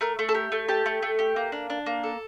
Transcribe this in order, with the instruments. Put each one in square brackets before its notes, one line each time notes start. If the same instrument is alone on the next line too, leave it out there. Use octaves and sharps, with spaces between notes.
[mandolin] A3 A#4
A3
A4
G4 A#4
A3
G4 A5
A3
A3
G4
A#3
D4
D4
A#3
A4